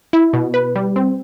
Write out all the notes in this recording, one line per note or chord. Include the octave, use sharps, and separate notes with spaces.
E4
B2
B4
G3
C4